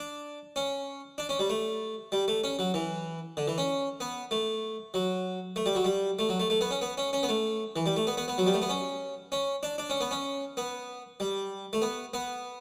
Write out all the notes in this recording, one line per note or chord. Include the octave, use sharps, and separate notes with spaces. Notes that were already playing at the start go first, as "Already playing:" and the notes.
Already playing: D4
C#4
D4
C#4
G3
A3
G3
A3
C#4
F#3
E3
D3
E3
C#4
B3
A3
F#3
A3
G3
F#3
G3
A3
F#3
A3
A3
B3
C#4
B3
C#4
C#4
B3
A3
E3
G3
A3
B3
B3
B3
F#3
G3
A3
B3
C#4
C#4
D4
D4
C#4
B3
C#4
B3
G3
A3
B3
B3